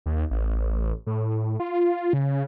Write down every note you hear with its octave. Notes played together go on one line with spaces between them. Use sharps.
D#2
A1
A2
F4
C#3